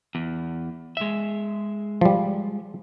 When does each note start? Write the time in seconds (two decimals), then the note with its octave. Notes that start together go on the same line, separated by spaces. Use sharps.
0.15 E2
0.97 G#3 E5
2.01 F3 G3